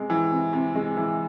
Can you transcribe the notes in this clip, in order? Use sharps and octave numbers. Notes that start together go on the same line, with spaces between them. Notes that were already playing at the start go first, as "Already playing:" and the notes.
Already playing: C3 G#3
E3
C3
C3
G#3
E3